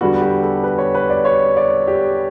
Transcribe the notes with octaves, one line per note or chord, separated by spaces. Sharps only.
E2 D3 G3 B3 F#4
G4
A4
B4
C#5
B4
D5
C#5
D5
G4